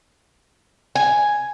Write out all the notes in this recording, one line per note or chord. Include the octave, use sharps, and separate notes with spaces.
G#5